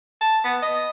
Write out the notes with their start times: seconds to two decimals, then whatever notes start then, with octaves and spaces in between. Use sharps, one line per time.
0.21 A5
0.44 B3
0.62 D#5